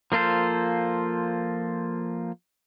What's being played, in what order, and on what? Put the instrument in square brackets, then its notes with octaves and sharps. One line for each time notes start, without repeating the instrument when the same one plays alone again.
[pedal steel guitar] F3 A#3 F4 A4 C5